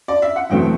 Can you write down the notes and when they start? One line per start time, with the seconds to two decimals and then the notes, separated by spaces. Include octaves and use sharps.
0.08 D5
0.22 E5
0.36 F#5
0.50 E2 B2 F#3 A3 C4 G5